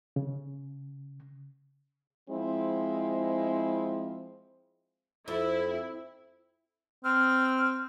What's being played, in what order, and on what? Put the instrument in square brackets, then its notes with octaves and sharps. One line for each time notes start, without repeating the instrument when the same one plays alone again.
[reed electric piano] C#3
[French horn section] F3 G#3 C4 E4
[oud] F2 [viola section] E4
[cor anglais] C4 [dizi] F6